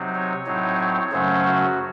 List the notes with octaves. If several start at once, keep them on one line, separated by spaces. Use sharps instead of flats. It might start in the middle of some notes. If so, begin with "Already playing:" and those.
Already playing: C3 F#3 C4 D#4
C#5
A2 F#3 C4 D#4
C#5
F#2 C#3 F#3 A3 C#4 C5
F#4